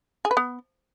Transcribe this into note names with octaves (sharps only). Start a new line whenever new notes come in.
G#4
B4
B3